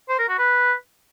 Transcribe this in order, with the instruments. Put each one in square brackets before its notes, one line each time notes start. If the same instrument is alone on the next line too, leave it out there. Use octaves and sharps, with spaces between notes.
[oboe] C5
A#4
F#4
B4